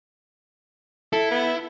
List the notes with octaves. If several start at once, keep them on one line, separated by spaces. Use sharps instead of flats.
E4 A4
B3